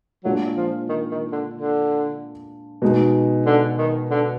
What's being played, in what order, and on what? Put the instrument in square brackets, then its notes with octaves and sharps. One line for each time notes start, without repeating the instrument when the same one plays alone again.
[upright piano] A#2 G#3 D4 F4 [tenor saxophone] F#3
[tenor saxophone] F3
D#3
D#3
D3
D3
[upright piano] B2 G#3 D#4
[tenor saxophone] D3
D#3
D3